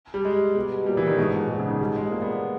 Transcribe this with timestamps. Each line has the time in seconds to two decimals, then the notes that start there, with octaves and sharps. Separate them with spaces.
0.14 G3
0.25 G#3
0.56 B2 G3
0.86 A#2 G3
0.97 E3
1.07 D#3
1.18 G#2 B2
1.34 A#2
1.49 G#2 B2
1.60 C#3
1.70 D#3
1.80 G3
1.96 G#3
2.11 A#2 A#3
2.22 B3